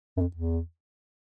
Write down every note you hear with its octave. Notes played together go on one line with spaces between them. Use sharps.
F#2
F2
E2